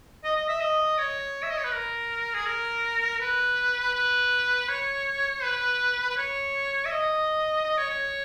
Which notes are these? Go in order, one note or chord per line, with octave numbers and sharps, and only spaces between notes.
D#5
D#5
E5
D#5
C#5
E5
D#5
C#5
B4
A#4
G#4
A#4
B4
B4
C#5
B4
B4
C#5
E5
D#5
D#5
C#5
C#5